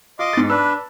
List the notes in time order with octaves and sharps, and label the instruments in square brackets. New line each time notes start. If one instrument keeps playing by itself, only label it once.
[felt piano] F4 [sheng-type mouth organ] D#5 C6 D6
[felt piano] G#2 A6
[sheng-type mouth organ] D4 B4 [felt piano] A5 E6